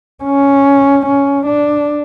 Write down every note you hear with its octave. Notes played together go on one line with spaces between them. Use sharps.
C#4
C#4
D4